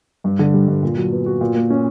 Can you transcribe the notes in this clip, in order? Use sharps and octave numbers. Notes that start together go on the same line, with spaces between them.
G2
D3
G3
G2
A#2
F#3
B3
F#4
A#2
A#3
C#4